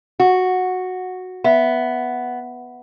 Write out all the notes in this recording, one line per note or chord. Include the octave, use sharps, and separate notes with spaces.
F#4
B3 E5